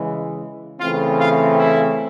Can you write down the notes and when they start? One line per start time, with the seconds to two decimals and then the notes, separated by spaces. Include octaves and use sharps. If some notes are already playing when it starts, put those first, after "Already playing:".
Already playing: C#3 E3 G#3
0.80 C#3 E3 A3 C4 F4 F5
1.19 F4 F5
1.58 E4 E5